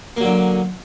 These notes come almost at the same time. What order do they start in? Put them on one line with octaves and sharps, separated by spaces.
A#3 F#3 D3